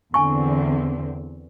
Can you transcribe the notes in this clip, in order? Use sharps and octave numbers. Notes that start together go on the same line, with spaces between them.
E2 D3 C4 G#5 C#6